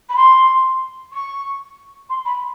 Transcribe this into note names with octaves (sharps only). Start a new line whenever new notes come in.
B5
C6
C#6
C6
B5